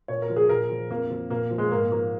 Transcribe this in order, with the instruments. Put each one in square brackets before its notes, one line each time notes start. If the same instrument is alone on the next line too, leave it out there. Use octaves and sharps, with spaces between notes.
[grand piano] A#2 C#5
A#4
F3
G#4
A#2 A#4
F3
F2 A#3
F3
A#2 A#3
F3
G#3
G#2 A#3
F3 A#3